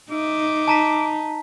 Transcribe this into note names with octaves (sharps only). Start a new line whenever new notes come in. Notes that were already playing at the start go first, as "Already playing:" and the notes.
D#4 E5 D6
A5 A#5 B6